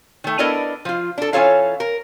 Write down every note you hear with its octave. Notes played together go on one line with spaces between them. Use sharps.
D#3 A3
B3 D4 E4 A4 A#4 D#5
F3 F4
D4 A4
E3 C#4 F4 A4 C#5 F5
A#4